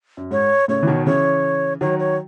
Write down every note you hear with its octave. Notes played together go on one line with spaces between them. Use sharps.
F#2
G#2 C#5
A2 C#3 C#5
E3
B2 D#3
C#3 E3 C#5
D#3 F#3 C#5
C#5